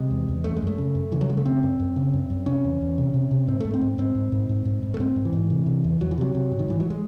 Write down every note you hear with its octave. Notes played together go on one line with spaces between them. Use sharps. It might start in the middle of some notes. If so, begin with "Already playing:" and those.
Already playing: C3 G#3
E2
E2
F#2 A3
G#3
F#2 A3
C#3
F#2
C#3 E3
F#3
C#3 G#3
A3
C#3 C4
F#2
F#2
C#3
F#2
F#2
C3 C#4
E2
E2
C3
C3
C3
G#2 C4
G#2 A3
C4
G#2
G#2 C4
G#2
G#2
G#2
G#2
G#2
A3
G#2 C4
G#2
E3
G#2
C3
C3
E2
E2 F#3
E3
C3 F#3
C3
G#2
D#3
G#2 E3
F#3
G#3